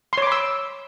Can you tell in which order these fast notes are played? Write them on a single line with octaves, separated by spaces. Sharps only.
C6 C#5 D6 B5 E6